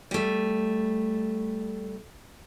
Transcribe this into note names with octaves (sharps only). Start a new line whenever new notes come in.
G3 A3